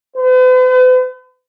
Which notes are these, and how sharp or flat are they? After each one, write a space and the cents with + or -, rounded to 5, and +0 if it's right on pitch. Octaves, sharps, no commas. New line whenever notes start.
B4 +45